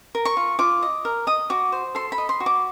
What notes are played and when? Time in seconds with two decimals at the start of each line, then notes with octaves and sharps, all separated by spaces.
0.15 A#4
0.25 C#6
0.37 F4
0.59 F4 D6
0.83 D#5
1.05 A#4
1.27 D#5 D#6
1.50 F#4 D6
1.72 C5
1.95 A4 C6
2.12 B5
2.18 D#5
2.29 C6
2.40 F#4
2.46 D6